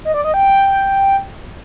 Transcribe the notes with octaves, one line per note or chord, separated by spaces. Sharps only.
D#5
D5
D#5
G5